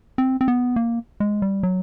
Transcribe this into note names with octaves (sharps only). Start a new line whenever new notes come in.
C4
C4
B3
A#3
G#3
G3
F#3